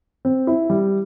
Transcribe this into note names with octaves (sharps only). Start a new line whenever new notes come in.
C4
E4
G3